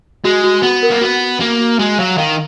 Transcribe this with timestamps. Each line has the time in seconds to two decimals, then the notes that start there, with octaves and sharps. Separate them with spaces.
0.24 G#3 F#4
0.44 F#4
0.62 B3 F#4
0.83 A#4
0.91 A#3
1.01 B3 F#4
1.21 F#4
1.40 A#3 F#4
1.60 F#4
1.79 G#3 F#4
1.99 F#3 F5
2.18 D#3 F5